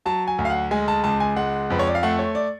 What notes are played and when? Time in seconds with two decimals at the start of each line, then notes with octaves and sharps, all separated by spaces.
0.06 F#3 A5
0.28 G#5
0.39 D2
0.45 F5
0.50 F#5
0.71 G#3 G#5
0.88 A5
1.04 C#2 A5
1.20 G#5
1.36 G#3 F#5
1.70 F2 B4
1.79 C#5
1.87 D5
1.95 F5
2.03 A3 F#5
2.19 C#5
2.35 D5